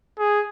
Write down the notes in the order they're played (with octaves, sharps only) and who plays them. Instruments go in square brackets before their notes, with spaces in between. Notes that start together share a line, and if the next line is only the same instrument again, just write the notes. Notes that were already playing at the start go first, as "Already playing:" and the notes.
[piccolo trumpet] G#4